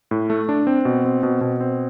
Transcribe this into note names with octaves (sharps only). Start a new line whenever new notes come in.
A2
A3
D4
C4
B2
C4
B2
B2
C4